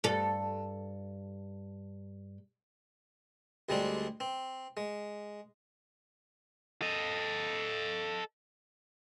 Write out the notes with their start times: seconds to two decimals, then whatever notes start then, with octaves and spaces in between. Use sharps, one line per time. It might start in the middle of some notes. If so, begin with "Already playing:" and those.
0.04 G2 A4
3.69 D2 G3 G#3 C4 D4
4.20 C4
4.77 G#3
6.82 A4 D#5